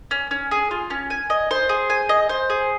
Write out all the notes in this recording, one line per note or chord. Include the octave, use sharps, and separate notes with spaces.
C#4
C#4
G#4
F4
C#4
G#5
D#5
C5
G#4
G#5
D#5
C5
G#4